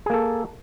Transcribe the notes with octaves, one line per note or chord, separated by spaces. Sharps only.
A#3 G#4 A4